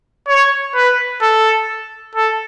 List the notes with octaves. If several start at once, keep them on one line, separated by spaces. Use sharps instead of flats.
C#5
B4
A4
A4